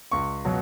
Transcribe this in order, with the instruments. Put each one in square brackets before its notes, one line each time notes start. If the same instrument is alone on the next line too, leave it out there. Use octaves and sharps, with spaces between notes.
[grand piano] C#2 C#6
B2 F#3